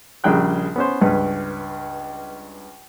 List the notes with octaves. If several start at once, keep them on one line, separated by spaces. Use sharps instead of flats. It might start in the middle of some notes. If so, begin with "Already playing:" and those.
A#1 C#3 G3 G#4 G5 F#6
B3 C#4 C5
C#2 G2 B4